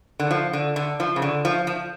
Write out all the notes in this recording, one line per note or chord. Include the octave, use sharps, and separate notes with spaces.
D3
F3
D3
D3
F3
C#3
D3
F3
F3